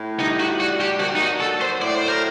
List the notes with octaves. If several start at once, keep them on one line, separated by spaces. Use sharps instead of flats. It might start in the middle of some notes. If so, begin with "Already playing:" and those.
Already playing: A2
G3 D#4
F#4
D4 F#4
G4
A#3 F#4
D#4
F#4
F#3 A4
C5
A2 D5
C5
A#4